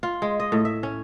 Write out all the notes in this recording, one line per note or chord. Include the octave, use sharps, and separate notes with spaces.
F4
G#3
D#5
A2
E5
C#4